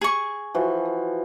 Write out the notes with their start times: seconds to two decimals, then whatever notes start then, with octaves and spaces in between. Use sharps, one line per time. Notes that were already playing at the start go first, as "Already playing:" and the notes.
0.01 G#4 C#6
0.54 E3 F3 F#4